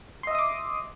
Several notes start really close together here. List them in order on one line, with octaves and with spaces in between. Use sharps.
C6 D#5 E5 D#6 D6